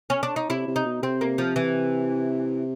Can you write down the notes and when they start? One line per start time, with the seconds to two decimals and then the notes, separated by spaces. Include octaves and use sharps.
0.10 C#4
0.23 D4
0.36 D#4
0.49 C3 E4
0.67 C3
0.76 D#4
0.86 B2
1.02 C3 C4
1.21 A#3
1.38 F3
1.56 E3